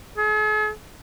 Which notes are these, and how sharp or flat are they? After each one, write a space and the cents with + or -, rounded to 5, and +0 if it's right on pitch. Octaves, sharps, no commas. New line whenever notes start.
G#4 +45